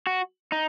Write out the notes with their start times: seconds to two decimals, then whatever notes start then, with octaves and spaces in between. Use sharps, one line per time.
0.07 F#4
0.52 D#4